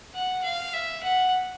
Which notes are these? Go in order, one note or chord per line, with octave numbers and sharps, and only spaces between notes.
F#5
F5
E5
F#5